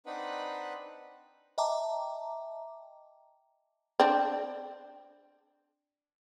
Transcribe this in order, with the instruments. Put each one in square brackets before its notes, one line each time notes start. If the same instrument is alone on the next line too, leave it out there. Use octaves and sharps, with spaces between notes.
[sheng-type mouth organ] C4 D4 D#4 B4 F#5 B5
[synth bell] D#5 E5 G5 A5 A#5 D6
[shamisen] C4 D4